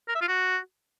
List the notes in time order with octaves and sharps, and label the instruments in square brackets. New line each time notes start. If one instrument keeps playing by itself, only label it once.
[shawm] A#4
E5
F4
F#4